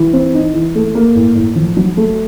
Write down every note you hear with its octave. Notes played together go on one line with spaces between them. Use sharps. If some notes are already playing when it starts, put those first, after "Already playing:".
Already playing: E3
C4
D#4
E3
A3
A#3
A2
A2
F3
F#3
A3